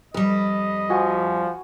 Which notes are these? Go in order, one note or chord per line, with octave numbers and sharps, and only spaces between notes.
F2 G3 B4 D#5
F3 F#4 G#5